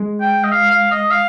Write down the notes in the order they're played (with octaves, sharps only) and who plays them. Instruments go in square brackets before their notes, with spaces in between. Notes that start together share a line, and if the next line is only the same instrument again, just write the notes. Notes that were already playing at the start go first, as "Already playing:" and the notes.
Already playing: [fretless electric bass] G#3
[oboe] G5
D#5
F5
F5
D#5
F5